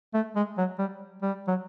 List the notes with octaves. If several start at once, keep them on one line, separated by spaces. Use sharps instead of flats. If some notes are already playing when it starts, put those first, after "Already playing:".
A3
G#3
F#3
G3
G3
F#3